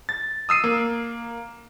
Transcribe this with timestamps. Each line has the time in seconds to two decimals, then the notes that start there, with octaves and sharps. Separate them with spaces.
0.09 A6
0.49 D#6 E6 C7 D#7
0.64 A#3